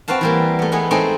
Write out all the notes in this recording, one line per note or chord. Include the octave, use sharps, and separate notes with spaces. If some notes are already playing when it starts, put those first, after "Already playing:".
C4 F#4 B4 F5 A5
E3 G3 A#3
A3 B3
G#3 A3 B3 G#4 A4
G#3 A3 C4 D#4 G#4